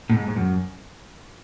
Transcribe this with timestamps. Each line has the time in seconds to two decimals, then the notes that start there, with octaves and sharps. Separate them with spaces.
0.09 A2
0.16 G#2
0.27 G#2
0.37 F#2